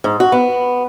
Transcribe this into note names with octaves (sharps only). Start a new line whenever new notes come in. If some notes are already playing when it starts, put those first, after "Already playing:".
G#2
F#4
B3